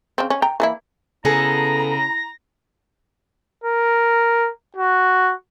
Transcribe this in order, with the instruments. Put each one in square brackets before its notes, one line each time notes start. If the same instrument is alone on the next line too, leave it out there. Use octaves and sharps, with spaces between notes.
[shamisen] C#3 C4
C#4
G5 A#5
E3 A#3 E4
[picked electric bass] C#3 [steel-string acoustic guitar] B3 G#4 A4 [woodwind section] E4 A#5 [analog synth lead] A#6
[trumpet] A#4
F#4